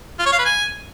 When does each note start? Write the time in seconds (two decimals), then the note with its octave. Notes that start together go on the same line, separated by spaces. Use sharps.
0.19 F4
0.26 C#5
0.32 F5
0.39 B4
0.45 G#5